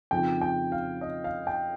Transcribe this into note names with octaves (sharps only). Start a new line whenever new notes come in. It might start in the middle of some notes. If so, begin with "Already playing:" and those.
F2 C#3 F3 C4 D#4 G5
G5
F5
D#5
F5
G5